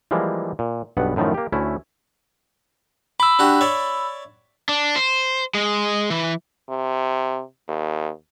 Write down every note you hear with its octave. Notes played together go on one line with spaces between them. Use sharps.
E3 F3 G3 G#3 A#3
A#2
B1 G2 B3 F#5
F#2 A2 D#3 F3 A3
A#3 G4
D2 A3 C#4 E4
B5 D6 E6
D4 F#4 G4
C#5 D5 E5
D4
C5
G#3
E3
C3
D#2